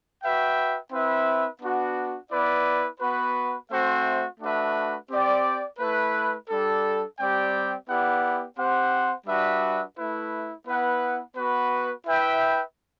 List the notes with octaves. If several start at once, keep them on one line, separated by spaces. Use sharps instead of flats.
F#4 B4 E5 G5
C4 E4 B4 E5
B3 D4 F#4
B3 E4 B4 D5
B3 F#4 B4
A3 C4 F#4 C5 E5
A3 D4 F#4 B4 E5
C4 G4 D5 G5
A3 E4 B4
G3 D4 A4
G3 C4 G4 D5 G5
B3 E4 G4 D5 F#5
C4 G4 C5 F#5
G3 D4 F#4 B4 E5
A3 E4 B4
B3 E4 B4 F#5
B3 F#4 B4
E4 B4 E5 G5